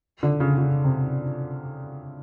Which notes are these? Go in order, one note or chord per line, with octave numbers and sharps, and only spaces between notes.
D3
C#3
C#3
C3